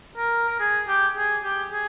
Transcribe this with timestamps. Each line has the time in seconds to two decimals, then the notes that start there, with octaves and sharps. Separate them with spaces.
0.17 A#4
0.49 A#4
0.60 G#4
0.88 G4
1.16 G#4
1.44 G4
1.72 G#4